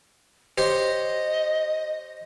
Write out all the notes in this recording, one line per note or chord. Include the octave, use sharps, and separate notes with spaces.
G4 C5 C#5 D#5